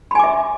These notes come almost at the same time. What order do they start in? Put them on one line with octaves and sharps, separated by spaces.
B5 G#5 D6 E5